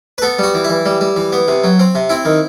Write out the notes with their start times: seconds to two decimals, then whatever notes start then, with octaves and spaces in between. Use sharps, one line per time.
0.18 B4
0.22 B3 A4
0.38 G3 F#4
0.54 E3
0.64 E4
0.69 E3
0.85 G3
1.01 G3
1.16 E3
1.32 B3
1.48 C3
1.64 F#3
1.79 C4
1.95 C3
2.09 C4 E4
2.25 D#3